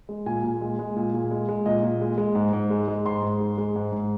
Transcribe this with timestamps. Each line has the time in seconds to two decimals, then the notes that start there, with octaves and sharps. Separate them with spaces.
0.09 G#3
0.26 A#2 G#5
0.44 A#2
0.61 G#3
0.79 G#3
0.96 A#2
1.14 A#2
1.31 G#3
1.49 G#3
1.66 A#2 D#5
1.83 A#2
2.01 G#3
2.18 G#3
2.35 G#2
2.53 G#2
2.70 G#3
2.88 G#3
3.05 G#2 C6
3.23 G#2
3.40 G#3
3.58 G#3
3.76 G#2
3.92 G#2